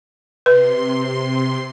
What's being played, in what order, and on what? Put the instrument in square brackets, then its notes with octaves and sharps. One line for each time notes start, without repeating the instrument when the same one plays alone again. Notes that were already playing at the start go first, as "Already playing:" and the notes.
[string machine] C3 C6 [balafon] B4